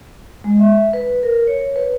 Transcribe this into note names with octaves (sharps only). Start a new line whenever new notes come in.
G#3
E5
B4
A#4
C#5
B4